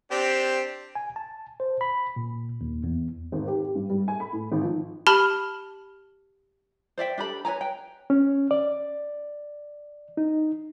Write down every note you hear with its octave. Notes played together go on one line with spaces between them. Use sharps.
C4 D4 G4
G#5
A5
C5
B5
A#2
D#2
E2
G#1
G4
G4
G2
G3
G#5
B5
A2
G#1
F3
G4 A5 B5 F6 F#7 G7
C5 D5 E5 G5
D4 G4 A4 B5
B4 C#5 G#5 A#5
G5
C#4
D5
D#4